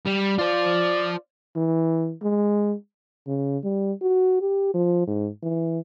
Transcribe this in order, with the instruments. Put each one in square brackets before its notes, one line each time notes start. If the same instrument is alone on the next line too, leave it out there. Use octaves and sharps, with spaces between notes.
[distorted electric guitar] G3
[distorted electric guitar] F4 C5 [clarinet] D5
[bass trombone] E3
G#3
[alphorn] C#3
G3
F#4
G4
F3
G#2
E3